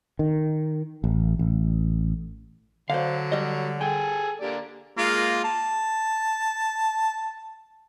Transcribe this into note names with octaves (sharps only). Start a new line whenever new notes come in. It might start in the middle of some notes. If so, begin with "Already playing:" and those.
D#3
A1
A1
D3 F#3 C5 D5 F5
G3 D#5
G#4 A4 G5 G#5
D3 A#3 G4 D5
G#3 A#3 F4
A5